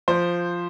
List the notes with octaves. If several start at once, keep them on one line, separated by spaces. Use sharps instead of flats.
F3 C5